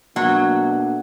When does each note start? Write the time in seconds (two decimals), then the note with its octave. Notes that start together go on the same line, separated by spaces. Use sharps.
0.16 B2 F#3 A3 A#3 D4 F#5